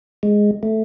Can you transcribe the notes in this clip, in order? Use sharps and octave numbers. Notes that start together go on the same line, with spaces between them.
G#3
A3